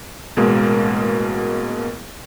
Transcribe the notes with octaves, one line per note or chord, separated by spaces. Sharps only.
A1 B2 G#3 A#3